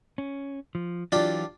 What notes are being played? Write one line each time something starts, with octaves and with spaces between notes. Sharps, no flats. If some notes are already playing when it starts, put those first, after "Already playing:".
C#4
F3
E3 F#3 D4 F4 G4